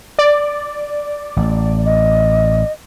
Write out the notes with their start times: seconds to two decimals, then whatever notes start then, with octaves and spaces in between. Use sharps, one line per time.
0.19 D5
1.37 A1
1.86 D#5